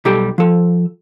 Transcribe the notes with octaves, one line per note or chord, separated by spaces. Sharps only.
B1 G3 G4 A4 G5
F3 A4